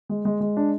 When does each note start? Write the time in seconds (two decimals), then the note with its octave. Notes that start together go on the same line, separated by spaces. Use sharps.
0.09 G#3
0.25 G#3
0.41 G#3
0.57 D4